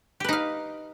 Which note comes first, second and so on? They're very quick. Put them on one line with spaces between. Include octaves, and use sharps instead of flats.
G4 B4 D#4 F5